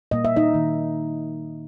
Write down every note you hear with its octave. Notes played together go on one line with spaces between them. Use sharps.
A#2 G3 A#3 D#5
E5
D#4 D#5
D#3 A#3